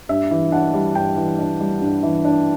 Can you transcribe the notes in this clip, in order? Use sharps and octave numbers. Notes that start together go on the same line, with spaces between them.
G2 E5
E3
D4 F#5
G3
G2 G5
E3
D4
G3
G2
E3
D4